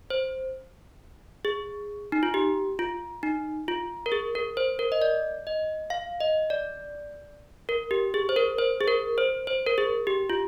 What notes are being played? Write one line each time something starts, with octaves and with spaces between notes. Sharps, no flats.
C5
G#4
D#4
F4
G4
F4
D#4
F4
A#4
G#4
A#4
C5
A#4
D#5
D5
D#5
F5
D#5
D5
A#4
G4
G#4
C5
A#4
C5
G#4
A#4
C5
C5
A#4
G#4
G4
F4